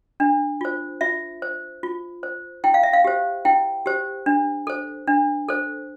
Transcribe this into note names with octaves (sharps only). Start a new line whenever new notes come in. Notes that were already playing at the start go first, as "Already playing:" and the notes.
D4
F4 C5
F4 E5
C5
F4
C5
E4 G5
F5
E5
F5
G4 C5
E4 G5
G4 C5
D4
A4 C5
D4
A4 C5